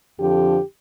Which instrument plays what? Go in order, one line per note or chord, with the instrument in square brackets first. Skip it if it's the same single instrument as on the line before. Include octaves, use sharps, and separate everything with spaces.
[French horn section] F2 D3 F3 G4